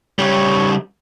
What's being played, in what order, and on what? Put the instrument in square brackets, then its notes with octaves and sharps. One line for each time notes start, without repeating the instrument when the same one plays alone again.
[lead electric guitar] C#3 G3 [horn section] C#5